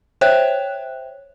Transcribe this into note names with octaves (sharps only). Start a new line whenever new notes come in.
C5 C#5 E5 G5 F#6